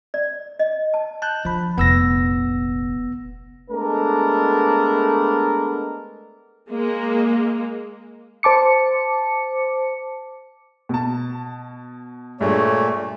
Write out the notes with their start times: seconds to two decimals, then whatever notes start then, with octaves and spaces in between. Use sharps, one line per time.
0.14 D5
0.59 D#5
0.94 A5
1.22 A5 F#6 G6
1.45 D3 F3 B5
1.78 F1 A#1 B3 E6 A#6
3.71 G#3 A3 B3 D4 A#4
6.70 G#3 A#3
8.43 C5 A5 D6 C#7
10.89 B2 A5
12.41 G2 A#2 G#3 A3 C#5